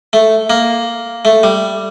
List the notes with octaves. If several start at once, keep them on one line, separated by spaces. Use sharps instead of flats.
A3
A#3
A3
G3